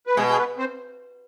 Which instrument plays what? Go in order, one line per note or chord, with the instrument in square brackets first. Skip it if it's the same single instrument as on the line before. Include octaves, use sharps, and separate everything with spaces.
[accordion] B4
[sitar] B2 [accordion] G#3 G#4
[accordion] G#4
B3 B4
C4 C5